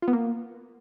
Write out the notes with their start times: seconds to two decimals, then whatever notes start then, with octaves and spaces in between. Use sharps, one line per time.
0.02 F4
0.08 B3
0.13 A#3